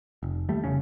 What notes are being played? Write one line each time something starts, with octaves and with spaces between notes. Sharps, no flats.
F1
D#2 G3 A3
F1 C#3 C#4